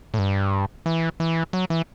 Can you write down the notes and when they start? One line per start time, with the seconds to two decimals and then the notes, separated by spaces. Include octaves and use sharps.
0.14 A2
0.19 G2
0.86 E3
1.20 E3
1.53 F#3
1.70 E3